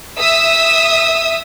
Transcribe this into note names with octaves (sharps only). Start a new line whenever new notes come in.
E5 D#6 E6